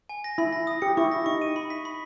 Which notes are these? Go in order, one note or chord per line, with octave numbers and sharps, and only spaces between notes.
G#5
A#6
E4 B5
A#6
D#6
G4 C#7
E4 C#6
A#6
D#4 C#6
D#7
B5
B6
B5